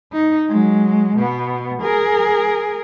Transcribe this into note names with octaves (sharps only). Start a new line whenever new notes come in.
D#4
F#3 G#3
B2 B3
G#4 A#4